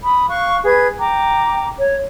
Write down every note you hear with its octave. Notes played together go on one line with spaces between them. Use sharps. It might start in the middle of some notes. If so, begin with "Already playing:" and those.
B5 D#6
F5 C#6 F#6
G#4 B4 G#6
G5 A#5 D6
C#5